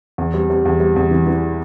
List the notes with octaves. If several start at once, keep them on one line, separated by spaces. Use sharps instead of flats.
E2
G3
G3
E2
G3
E2
E3
E3